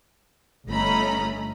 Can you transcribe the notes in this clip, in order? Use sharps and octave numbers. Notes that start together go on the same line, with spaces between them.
G1 A3 C#4 D#5 A#5 B5